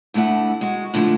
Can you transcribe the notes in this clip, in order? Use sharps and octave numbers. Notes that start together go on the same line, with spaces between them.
D2 D3 A3 E4 F#5
G#3 F#4
A2 D3 F3 G#3 A3